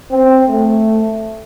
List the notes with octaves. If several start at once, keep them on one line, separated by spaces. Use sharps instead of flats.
C4
A3